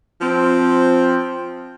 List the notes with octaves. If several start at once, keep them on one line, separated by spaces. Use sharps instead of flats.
F3 C4